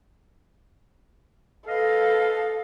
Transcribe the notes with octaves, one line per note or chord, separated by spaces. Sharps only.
A4 B4 D#5 F5